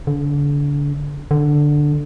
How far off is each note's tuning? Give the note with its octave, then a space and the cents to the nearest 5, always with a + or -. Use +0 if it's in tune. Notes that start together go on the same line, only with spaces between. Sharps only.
D3 -35
D3 +5